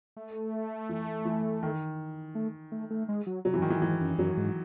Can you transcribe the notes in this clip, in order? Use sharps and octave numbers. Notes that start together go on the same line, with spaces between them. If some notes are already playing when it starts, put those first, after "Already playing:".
A3
E3
E3
D#3
A3
A3
A3
G#3
F#3
C3 F#3
E3
F#2
G#2 D#3
E3
G#2 E3
F#2
F#2 F#3
G#2